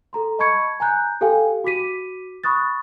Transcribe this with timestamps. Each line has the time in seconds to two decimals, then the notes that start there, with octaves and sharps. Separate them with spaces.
0.13 A4 A#5 C6
0.39 D#5 A5 B5 C#6 G#6 C#7
0.80 G#5 A#5 F#6 G6
1.21 G4 A4 F5 G5 G#5
1.64 F#4 D6 B6 D#7
2.44 B5 C#6 D#6 F#6 A6